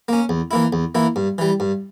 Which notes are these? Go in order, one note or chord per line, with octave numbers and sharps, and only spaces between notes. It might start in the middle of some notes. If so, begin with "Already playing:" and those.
A#3 C#4
E2
E3 A#3 E4
E2
E3 A#3 E4
G2
E3 G3
G2